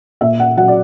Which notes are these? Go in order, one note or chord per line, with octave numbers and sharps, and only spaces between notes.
A#2 E5
F#5
F#3 F#5
D5